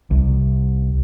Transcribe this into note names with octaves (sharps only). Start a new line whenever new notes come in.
C2